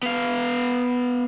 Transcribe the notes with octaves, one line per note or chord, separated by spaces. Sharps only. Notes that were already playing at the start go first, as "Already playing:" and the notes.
B3 F5